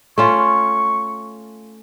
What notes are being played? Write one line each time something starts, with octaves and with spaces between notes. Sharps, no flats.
A3 C#4 F4 C#6